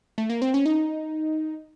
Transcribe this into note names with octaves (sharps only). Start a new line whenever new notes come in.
A3
A#3
C4
C#4
D#4